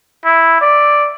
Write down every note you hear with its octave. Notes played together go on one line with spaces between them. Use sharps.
E4
D5